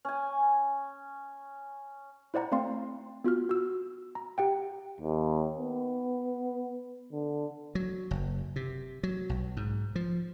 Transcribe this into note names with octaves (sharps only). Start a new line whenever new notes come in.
C#4 G#5
E4 C5 D5 F#5 A#5
A3 C4 D5 F5 C6
B3 F4 F#4 F6
F#4 E6
A#5
G4 F#5 G5
D#2
B3
D3
F#3
F#1
C3
F#3
B1
G#2
F3